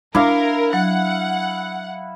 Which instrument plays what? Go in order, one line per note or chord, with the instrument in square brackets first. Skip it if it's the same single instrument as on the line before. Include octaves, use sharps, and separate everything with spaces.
[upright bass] D4 [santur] E4 F5 [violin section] A#4 [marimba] D6
[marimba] F#3 [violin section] F#5